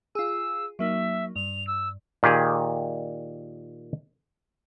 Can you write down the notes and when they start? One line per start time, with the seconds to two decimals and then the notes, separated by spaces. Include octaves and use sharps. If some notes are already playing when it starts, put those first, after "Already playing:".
0.15 F4 G#4 E6
0.79 F#3 A#3 D#4 E5
1.36 G2 F7
1.67 E6
2.23 A#2 D#3 G4 G#4